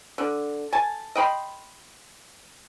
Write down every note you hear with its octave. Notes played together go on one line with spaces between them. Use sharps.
D3
G#5 A5
D#5 G5 B5 C6